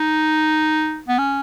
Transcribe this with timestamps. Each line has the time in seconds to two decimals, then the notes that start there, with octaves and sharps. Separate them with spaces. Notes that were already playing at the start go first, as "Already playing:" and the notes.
Already playing: D#4
1.08 B3
1.18 C#4